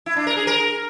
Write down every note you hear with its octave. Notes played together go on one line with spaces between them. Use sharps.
E4
D4
A#4
G#4
A#4